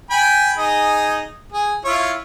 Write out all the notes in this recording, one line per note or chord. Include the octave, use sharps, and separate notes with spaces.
G5 G#5 B5
D#4 G#4
G#4
E4 F4 C#5